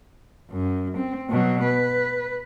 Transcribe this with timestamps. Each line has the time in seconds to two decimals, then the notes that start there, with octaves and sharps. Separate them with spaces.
0.51 F#2
0.98 C4
1.30 B2 F#3
1.64 B4